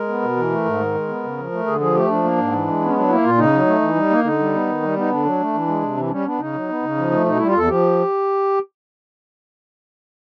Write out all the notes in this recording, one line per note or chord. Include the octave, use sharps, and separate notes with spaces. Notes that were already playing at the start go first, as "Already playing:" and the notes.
Already playing: G#3 A#4
B3
B2
E3
A3
G#2
D#3
G#3
B3
C#3
F3
A3
D3 G#4
F3 G#4
A3 G4
F3 D4
A#3
G#2
E3
G#3
B3 C#4
F#3 D4
A#3 E4
A#2 F4
C#3 D#4
F#3
A3
E3
G3
A#3
D3 D#4
G3
B3
D#3
G3
B3 D#4
D3 D4
F#3
A3
E3
G#3
C3
E3
D4
G3 C#4
B3 D4
C#3 D#4
F#3
B3
C#3
F3
A3
B2 D#4
G3 E4
F4
E2 A4
F3 G4